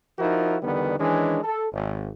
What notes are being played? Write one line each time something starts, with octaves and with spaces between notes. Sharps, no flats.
F3 D#4 E4 F#4 A#4
E2 D3 D#3 G3 B3
D#3 E3 G#3 C#4 D4
A4
G#1